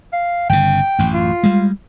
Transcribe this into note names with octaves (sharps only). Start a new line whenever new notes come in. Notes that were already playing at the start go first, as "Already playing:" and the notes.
F5
G1 C#3 G5
A1 F#2
F4
G3 G#3